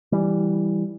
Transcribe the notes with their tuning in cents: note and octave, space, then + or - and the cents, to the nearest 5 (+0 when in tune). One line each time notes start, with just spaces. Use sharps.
E3 +0 G3 +0